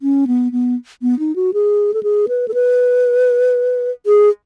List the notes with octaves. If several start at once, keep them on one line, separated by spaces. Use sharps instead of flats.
C#4
B3
B3
B3
D#4
F#4
G#4
A4
G#4
B4
A4
B4
G#4